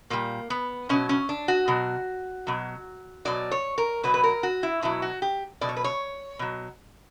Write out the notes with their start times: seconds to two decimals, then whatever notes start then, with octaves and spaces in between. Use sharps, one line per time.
0.10 A#2 G3 A#3
0.50 B3
0.89 B2 F#3 C#4
1.09 C#4
1.29 D4
1.48 F#4
1.68 B2 F#3
2.47 B2 F#3
3.25 B2 F#3 D5
3.51 C#5
3.78 A#4
4.03 B2 F#3 B4
4.14 B4
4.24 A#4
4.43 F#4
4.63 E4
4.82 B2 F#3 E4
5.02 F#4
5.22 G4
5.61 B2 F#3 D5
5.69 C#5
5.76 B4
5.84 C#5
6.39 B2 F#3